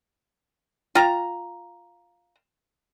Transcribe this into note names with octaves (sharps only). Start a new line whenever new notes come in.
F4 G5 A#5